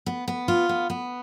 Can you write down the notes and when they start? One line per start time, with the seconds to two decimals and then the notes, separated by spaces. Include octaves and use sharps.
0.06 B3
0.28 B3
0.48 F4
0.69 B3
0.90 B3